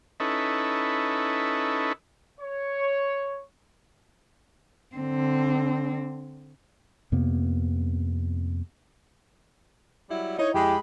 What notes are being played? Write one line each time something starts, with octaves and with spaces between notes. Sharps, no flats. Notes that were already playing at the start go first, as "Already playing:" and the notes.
C#4 D#4 E4 A4 B4
C#5
D3 C4
F2 C3 A#3 B3
F#3 G3 E4
D#4 E4 C#5 D#5
F2 G#3 E4 G4 B5